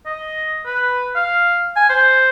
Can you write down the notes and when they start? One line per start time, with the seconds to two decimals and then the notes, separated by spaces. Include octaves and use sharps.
0.06 D#5
0.66 B4
1.16 F5
1.76 G#5
1.90 C5